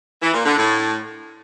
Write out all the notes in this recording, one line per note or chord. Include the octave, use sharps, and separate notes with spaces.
E3
A#2
D3
A2